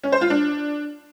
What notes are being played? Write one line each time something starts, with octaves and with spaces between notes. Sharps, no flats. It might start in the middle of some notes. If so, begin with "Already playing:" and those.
C#4
C5
F4
D4